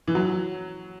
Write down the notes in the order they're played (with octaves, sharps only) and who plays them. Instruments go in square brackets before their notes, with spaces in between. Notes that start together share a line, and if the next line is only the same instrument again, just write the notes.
[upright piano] E3
F#3